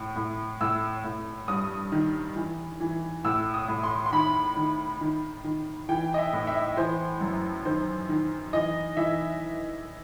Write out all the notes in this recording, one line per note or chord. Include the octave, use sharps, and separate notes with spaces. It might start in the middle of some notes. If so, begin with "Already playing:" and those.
Already playing: A2
A2
A2 E6
A2
G2 D#6
D#3
E3
E3
A2 E6
D#6
A2
C6
C6
D#3 B5
D#3
D#3
D#3
E3 G5
D#5
E5
A2
E5
E3 C5
F#2
D#3 C5
D#3
E3 D#5
E3 E5